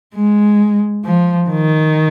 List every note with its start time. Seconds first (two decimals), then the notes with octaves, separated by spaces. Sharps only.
0.15 G#3
1.05 F3
1.50 D#3